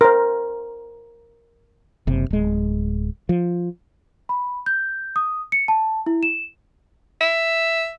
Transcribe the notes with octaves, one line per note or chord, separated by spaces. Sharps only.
A#4 C5
F#1 C3
D1 G#3
F3
B5
G6
D#6
C#7
A5
E4
E7
E5